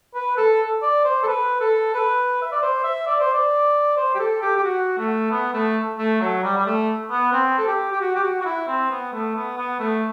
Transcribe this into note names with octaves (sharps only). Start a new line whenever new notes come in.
B4
A4
D5
C5
A4
B4
A4
B4
E5
D5
C5
E5
D5
C5
D5
C5
G4
A4
G4
G4
F#4
A3
B3
A3
A3
F#3
G3
G3
A3
B3
C4
A4
G4
G4
F#4
G4
F#4
F#4
E4
C4
B3
A3
B3
B3
A3